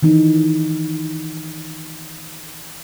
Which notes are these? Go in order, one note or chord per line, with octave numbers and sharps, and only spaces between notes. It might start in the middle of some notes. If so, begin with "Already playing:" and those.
D#3 E3 D#4